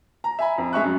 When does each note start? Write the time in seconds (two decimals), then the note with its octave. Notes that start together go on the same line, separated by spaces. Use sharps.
0.24 A#5
0.39 E5 G#5 B5
0.58 F2
0.73 G#3 E5 C#6 F#6
0.84 F#2